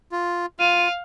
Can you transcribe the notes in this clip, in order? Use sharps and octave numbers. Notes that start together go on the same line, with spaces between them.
F4
F4 F5 D#7